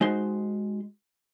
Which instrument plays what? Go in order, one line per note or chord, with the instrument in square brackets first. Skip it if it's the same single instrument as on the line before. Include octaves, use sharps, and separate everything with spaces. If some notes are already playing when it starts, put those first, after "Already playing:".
[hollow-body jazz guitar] G#3 D#4 F#4 C5 C6